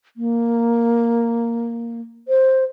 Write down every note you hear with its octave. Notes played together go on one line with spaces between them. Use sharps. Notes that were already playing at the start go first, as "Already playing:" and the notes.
A#3
C5